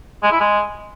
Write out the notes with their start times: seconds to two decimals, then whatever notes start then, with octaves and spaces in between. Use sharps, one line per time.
0.23 G#3
0.31 E4
0.40 G#3